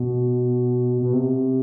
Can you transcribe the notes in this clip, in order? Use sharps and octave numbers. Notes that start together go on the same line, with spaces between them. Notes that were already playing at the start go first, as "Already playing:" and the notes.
Already playing: B2
B2
C3